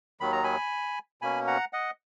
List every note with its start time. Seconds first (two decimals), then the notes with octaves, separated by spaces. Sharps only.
0.21 D#2 D#3 F#3 B5
0.32 A#5
0.43 G#5 B5
1.22 B2 A#3 C#4 G#5 B5
1.47 F#5 A#5
1.73 D#5 F#5